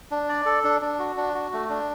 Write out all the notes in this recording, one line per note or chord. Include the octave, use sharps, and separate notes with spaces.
D4
D5
A4
D4
D4
F#4
D4
F#4
A3
D4